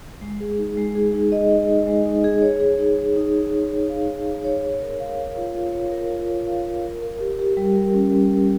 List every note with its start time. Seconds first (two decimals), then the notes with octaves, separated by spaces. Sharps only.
0.21 G#3
0.40 G#4
0.58 D#4
0.77 G#3
0.95 G#4
1.14 D#4
1.32 D#5
1.51 D#4
1.69 D#4
1.87 G#3
2.06 D#4
2.24 G#4
2.42 C#5
2.60 G#4
2.79 D#4
2.98 C#5
3.16 D#4
3.35 G#4
3.52 C#5
3.71 C#5
3.90 F5
4.08 D#4
4.26 G#4
4.44 C#5
4.63 C#5
4.81 A#4
5.00 F5
5.18 A#4
5.36 F4
5.55 F4
5.73 C#5
5.92 A#4
6.10 F4
6.29 C#5
6.47 F5
6.65 A#4
6.83 A#4
7.02 A#4
7.20 G4
7.39 G4
7.57 G3
7.75 A#4
7.94 C#4
8.12 G3
8.31 A#4